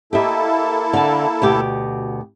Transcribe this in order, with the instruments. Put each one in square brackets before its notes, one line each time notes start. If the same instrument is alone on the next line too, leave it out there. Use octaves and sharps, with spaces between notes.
[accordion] A#3 E4 A4 [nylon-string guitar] G4 D#5 E5
[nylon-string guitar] D3 A5
D2 B2 G4